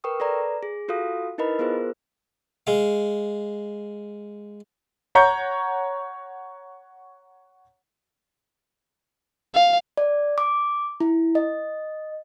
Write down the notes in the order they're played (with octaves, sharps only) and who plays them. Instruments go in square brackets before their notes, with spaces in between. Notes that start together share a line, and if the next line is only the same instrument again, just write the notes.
[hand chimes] A#4 B4 G5 C#6 D#6
A4 B4 D5 A#5
G#4
F4 F#4 A4 F5 D#6
D#4 E4 A#4 B4 D#5 B5
B3 F4 G#4 A#4 C5
[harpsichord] G#3 F5
[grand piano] C#5 F#5 A#5 C#6 G6
[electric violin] F5
[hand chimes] D5
D6
E4
D#5